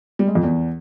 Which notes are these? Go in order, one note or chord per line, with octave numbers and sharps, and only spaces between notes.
G3
G#3
F2
E2